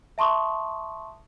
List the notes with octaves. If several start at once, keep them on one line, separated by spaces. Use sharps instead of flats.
E5 A5 C6 C#6 D#6